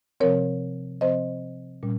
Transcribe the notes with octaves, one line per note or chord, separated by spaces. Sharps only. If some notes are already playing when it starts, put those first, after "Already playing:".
C3 F3 C4 A#4 C#5
C3 F3 C4 C5 D#5
A#2 G3 C#4